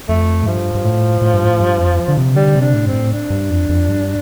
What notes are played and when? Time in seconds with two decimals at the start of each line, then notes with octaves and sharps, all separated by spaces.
0.09 F2 A3
0.43 A2
0.46 G2 F3
0.75 G2
0.84 A2
1.22 A2
1.33 G2
1.44 A2
1.60 G2
1.79 F2
2.08 D3
2.17 C3
2.36 D3 G3
2.55 C3
2.61 D4
2.74 A2
2.87 G2 C4
2.93 A2
3.12 D4
3.30 G2
3.50 F2
3.69 F2
3.88 G2